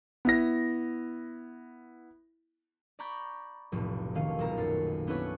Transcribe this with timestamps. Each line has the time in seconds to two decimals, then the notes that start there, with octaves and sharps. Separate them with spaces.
0.25 B3 E4 A#6
2.99 D5 A#5 B5 C#6 G6
3.72 F1 B1 A2
4.15 D#3 A3 C#4 F5 D#7
4.38 D#1 B1 A4 A#4 A#5
4.57 F#2 F5 A6 C#7
5.07 B3 C#4 D4 E4 B4 C#5